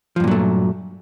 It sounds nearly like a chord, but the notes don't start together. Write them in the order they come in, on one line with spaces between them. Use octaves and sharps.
F3 G2 A#2 F#3 A3